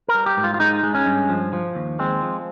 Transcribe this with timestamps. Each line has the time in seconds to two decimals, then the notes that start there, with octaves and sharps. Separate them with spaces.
0.08 A#4
0.15 G3
0.26 G4
0.37 G#2
0.44 F4
0.54 F4
0.60 G#3 D#4
0.84 G#3
0.95 C#4
1.06 G2
1.30 F3
1.53 F3
1.75 D#2
1.99 G#3 C4
2.22 F3